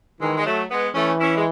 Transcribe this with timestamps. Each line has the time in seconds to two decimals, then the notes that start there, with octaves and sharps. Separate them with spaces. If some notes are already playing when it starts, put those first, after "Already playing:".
0.21 D#3 E3 G#3
0.37 G#3
0.45 F#3 A3
0.70 G#3 B3
0.94 E3 A3 C#4
1.20 C#4 E4
1.36 G#3